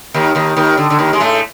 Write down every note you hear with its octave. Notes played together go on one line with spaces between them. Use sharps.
D#2 D#3
D#2 D#3
D#2 D#3
D3
D3
D#2 D#3
G#3
A2 A3